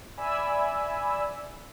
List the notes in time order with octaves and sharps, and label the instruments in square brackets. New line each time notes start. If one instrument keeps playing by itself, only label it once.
[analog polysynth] D5 E5 G#5 B5 E6